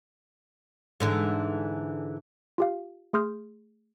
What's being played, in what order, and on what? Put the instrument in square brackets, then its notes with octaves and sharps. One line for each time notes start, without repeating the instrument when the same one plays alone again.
[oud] G#2 D3 E3
[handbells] F4 G4 F5
A3 G#4 C6 D#6 F6 G6